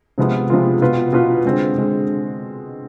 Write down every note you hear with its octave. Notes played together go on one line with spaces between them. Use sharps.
C3 F3 G#3 B3 F4
C3 F3 G#3 B3 F4
B2 B3 F4 B4
B2 B3 F4 B4
D3 G#3 C4
D3 G#3